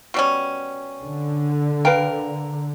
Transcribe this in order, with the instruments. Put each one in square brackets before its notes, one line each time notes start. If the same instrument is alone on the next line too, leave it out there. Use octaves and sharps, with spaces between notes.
[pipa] B2 G3 C#4
[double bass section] D3
[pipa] A#4 [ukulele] B4 F5 G5